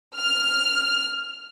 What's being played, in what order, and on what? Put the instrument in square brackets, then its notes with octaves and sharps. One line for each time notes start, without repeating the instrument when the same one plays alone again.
[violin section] F6